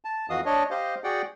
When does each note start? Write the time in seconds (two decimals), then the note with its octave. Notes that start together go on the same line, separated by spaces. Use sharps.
0.05 A5
0.30 F2 E3 F#4 D#5 F5 D#6
0.46 D4 C#5 D#5
0.71 G4 C5 D#5 F5
1.04 F#4 G#4 D5 F#5 G5